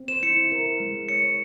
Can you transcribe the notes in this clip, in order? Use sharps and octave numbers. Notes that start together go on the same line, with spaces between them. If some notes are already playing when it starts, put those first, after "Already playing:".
Already playing: C4
C5 E7
E4 C#7
E4
A#4
A#4
G#3
E4
C#5 C#7
C#5